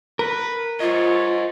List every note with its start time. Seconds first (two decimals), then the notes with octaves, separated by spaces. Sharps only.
0.19 A#4 B4
0.80 F4 C5 C#5 D#5